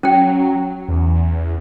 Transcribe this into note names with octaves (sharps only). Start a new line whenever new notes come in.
F#3 C#4 G5
E2